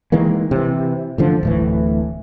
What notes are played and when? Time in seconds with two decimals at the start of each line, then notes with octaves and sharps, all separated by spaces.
0.12 D#3 E3 G#3 A#3
0.51 C3 E3
1.18 A1 D3 F3
1.43 D1 A2 E3